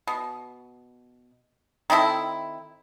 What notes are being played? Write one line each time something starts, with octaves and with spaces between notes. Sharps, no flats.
B2
D#3 C4 E4 A4